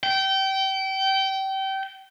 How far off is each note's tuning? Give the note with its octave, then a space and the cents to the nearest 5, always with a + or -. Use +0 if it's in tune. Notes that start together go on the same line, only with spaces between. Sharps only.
G5 -25